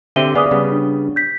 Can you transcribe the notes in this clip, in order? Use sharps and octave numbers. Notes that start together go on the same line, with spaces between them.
D3 C4 G4 E5 D#7 G7
B3 G#4 D5 F5 D6 D#6
C#3 G3 B3
D4
G6 B6